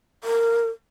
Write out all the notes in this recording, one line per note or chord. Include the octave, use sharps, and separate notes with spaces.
A#4